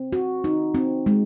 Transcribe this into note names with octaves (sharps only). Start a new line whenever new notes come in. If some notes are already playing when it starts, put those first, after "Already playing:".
Already playing: C4
F#4
D#4
C4
G#3